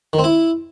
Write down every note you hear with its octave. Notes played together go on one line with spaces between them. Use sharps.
D#3
C4
E4